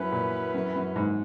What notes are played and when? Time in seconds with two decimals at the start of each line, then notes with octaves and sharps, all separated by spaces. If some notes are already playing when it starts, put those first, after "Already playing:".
Already playing: F#2 F#3 C#4 E4 B4
0.12 A#2
0.54 F#2
0.75 F#2
0.96 G#2